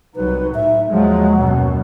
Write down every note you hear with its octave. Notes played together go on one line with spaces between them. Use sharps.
C2 F#3 D#4 B4
A2 E5
D#2 F3 F#3 G#3
F#2 B2